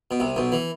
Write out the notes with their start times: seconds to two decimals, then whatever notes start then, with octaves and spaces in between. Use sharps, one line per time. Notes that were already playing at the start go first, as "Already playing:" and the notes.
0.11 B2
0.20 C2 C3
0.36 B1 B2
0.52 E3